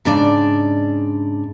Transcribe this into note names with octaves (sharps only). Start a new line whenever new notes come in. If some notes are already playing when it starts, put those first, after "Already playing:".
G#2 C#3 D4 D5